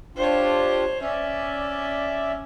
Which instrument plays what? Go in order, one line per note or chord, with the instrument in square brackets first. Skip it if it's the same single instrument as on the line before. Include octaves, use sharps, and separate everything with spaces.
[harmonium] D4 F4 G4 [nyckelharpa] C5 C#5
[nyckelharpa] C#4 [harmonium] D5 E5